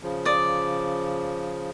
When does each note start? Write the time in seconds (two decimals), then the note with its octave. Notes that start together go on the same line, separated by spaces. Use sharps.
0.03 C#3 F3
0.25 D5 D#6